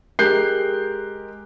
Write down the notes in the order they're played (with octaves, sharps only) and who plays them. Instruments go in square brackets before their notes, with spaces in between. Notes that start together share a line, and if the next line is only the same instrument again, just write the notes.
[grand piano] G#3 G4 A#4 F#6 G6 C7